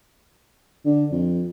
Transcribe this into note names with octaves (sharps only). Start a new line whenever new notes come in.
D3
F2